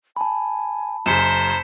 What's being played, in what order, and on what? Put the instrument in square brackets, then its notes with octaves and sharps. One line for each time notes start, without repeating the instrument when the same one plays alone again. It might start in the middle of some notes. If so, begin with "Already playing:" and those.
[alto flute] G#5 [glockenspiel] A5 B5
[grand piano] F#1 F#2 [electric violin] C5 [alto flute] A#5 [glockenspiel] B6 C#7 E7